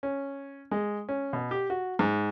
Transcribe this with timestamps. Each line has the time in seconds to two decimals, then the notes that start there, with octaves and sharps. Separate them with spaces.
0.03 C#4
0.71 G#3
1.09 C#4
1.33 B2
1.51 G4
1.70 F#4
1.99 G#2